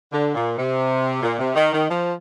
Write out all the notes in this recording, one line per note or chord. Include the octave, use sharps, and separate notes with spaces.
D3
A#2
C3
A#2
C3
D#3
D#3
F3